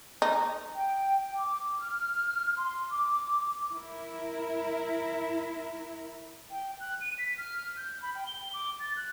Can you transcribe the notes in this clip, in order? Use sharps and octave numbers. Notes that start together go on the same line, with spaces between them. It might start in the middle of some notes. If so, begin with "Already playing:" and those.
D#4
G5
D6
F6
C6
D6
E4 A#4
G5
F#6
D#7
B6
F6
G6
B5
G5
G7
D6
A6
F#6